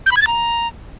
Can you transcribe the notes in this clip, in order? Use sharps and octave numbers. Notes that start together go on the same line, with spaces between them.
G6
B5
G#6
A6
A#5